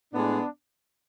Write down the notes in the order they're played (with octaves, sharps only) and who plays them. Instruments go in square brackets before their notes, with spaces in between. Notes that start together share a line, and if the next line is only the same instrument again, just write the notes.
[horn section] A2 G#3 B3 D4